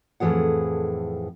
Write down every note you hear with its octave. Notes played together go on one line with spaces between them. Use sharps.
F2 A2 C3 E3 G#4 F#5